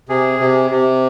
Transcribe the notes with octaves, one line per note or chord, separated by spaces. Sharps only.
C3 G#4
C3
C3